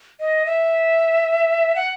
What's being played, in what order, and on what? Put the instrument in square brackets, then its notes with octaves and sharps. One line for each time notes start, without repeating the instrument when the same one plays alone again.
[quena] D#5
E5
F#5